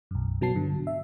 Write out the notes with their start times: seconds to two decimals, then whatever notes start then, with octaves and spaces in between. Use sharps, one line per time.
0.11 B1 F#2
0.41 B2 F#3 B3 A5 C7
0.56 G2 D3
0.87 E5